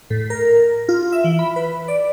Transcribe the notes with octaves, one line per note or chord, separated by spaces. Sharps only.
A2
A#4
F4
E5
E3
B5
B4
D5